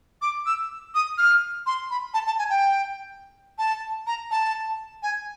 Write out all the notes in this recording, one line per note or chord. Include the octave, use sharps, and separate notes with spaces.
D6
E6
D#6
F6
C6
B5
A5
A5
G#5
G5
A5
A#5
A5
G#5